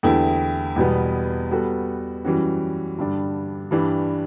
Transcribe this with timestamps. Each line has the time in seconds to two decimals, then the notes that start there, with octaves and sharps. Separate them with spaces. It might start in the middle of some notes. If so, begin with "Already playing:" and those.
0.03 E2 D3 A3 E4 G4
0.76 E2 B2 G3 B3
1.51 G3 B3 F#4 A4
2.25 F#2 E3 G3 C#4 F#4
2.98 G2 D3 G3 D4
3.71 G2 E3 G3 D4